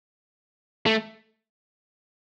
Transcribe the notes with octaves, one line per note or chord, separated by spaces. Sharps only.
A3